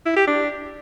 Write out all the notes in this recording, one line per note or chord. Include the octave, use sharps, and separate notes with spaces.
E4
G4
D4